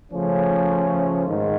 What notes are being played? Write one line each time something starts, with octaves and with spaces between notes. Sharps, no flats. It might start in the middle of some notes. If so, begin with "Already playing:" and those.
C#3 F3 A3 C#4
G#2 D#3